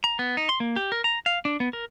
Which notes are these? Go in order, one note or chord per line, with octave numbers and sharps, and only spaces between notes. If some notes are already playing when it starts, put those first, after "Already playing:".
A#5
B3
D#4
C6
A#3
G4
A#4
A#5
F5
D4
B3
A#4